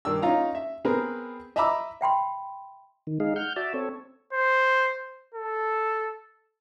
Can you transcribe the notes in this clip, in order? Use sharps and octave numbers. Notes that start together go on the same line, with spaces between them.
G2 D#3 D4 E6
C#4 D#4 F4 F5 A#5
E5
B3 C4 G#4 A#4 B4
D#5 E5 A#5 B5 D6 E6
E5 G5 B5 C6
D#3
G#3 D#4 G#4 F5
F#5 F6 G6
F#4 D5 E5 A5
C4 A4 C#5
C5
A4